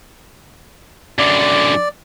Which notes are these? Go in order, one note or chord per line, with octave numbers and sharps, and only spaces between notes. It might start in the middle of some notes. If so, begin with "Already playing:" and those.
F#2 D3 D5